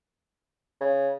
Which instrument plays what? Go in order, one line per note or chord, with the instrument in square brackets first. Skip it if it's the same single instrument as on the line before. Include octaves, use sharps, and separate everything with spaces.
[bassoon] C#3